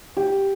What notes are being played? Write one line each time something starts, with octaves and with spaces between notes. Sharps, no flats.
G4